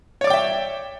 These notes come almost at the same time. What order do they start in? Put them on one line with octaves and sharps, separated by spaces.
C#5 D5 D6 G5 E5